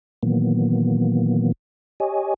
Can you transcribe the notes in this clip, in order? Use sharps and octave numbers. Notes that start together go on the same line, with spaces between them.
A#2 D#3 E3 F#3 A#3 B3
G4 C#5 D#5 G#5